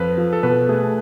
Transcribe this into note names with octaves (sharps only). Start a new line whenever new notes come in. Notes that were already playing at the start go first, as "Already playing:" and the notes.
Already playing: F2 F4 B4
F3
A4
B2 B4
A3 G#4